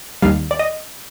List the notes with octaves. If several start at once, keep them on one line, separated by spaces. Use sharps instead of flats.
D#2 D#3 G3 F5
D5
D#5